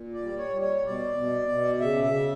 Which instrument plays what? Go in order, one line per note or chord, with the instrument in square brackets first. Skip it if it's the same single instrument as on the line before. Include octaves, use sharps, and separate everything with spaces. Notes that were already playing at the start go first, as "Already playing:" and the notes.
Already playing: [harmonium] A#2
D5
G3
C#5
G3
C#5
B2 D5
B2
B2
C#3 E5
E5
C#3